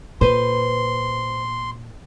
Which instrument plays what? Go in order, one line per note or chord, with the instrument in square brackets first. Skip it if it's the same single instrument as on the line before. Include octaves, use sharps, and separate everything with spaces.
[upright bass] A#2 [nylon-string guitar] B4 C5 [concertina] C6